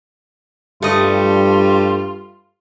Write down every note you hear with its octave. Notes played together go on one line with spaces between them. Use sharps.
G2 G3 A3 F4 D#5